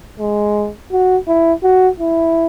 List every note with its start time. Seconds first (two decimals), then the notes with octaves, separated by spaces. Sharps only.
0.20 G#3
0.92 F#4
1.28 E4
1.63 F#4
2.00 E4